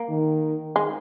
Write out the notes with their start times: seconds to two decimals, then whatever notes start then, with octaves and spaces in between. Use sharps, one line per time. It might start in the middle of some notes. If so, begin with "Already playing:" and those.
Already playing: A#3
0.09 D#3
0.76 G#3